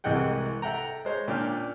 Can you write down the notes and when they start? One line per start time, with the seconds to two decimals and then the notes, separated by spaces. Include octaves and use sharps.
0.04 C2 C3 E3 G#3 F#5 G5
0.62 A4 E5 F#5 G5 A#5
1.05 G#3 C5 C#5
1.28 A#2 C#4 D4 G5 F6